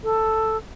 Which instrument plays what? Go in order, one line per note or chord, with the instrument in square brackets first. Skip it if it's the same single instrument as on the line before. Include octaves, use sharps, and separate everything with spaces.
[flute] A4